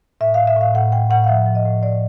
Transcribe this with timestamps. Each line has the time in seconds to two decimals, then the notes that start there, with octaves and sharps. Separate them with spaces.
0.21 A2 E5
0.34 A2 F5
0.47 E5
0.56 A2 F5
0.75 A2 F#5
0.92 A2 G5
1.10 A2 F#5
1.24 F5
1.28 F3 E5
1.46 F3
1.55 D#5
1.65 A2
1.83 A2 D5